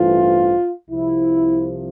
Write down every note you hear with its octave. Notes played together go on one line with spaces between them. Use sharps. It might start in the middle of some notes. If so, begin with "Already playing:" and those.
Already playing: A1 G2 E3 A3 C4 F4
C2 C3 F3 E4